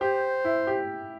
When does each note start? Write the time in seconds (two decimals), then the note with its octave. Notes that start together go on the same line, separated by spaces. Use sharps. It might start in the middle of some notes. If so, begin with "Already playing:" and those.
0.01 G4 C5
0.45 E4
0.67 G4